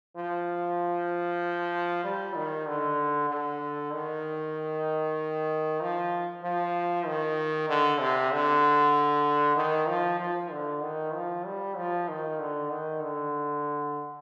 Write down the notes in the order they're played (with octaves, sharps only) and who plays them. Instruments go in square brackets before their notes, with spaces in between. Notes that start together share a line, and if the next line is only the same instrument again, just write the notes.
[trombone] F3
G3
D#3
D3
D3
D#3
F3
F3
D#3
D3
C3
D3
D#3
F3
F3
D3
D#3
F3
G3
F3
D#3
D3
D#3
D3